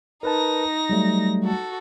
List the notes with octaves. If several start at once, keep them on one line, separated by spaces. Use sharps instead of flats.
D#4 A#4 B4 A5 A#6
F#3 G3 A3
F#4 A4